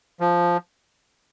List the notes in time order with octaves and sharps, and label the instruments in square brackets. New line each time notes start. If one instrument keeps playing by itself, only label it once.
[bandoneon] F3